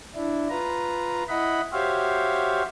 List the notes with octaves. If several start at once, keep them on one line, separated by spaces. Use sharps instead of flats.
D4 E4
F4 B4 A#5
E4 D#5 F#5 B5
F#4 G4 C5 C#5 E5 F5